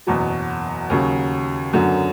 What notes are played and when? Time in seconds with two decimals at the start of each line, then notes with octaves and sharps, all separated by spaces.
0.07 F#1 E2 B2 F#3
0.90 D#2 C#3 F#3
1.73 F#2 D3 F#3 B3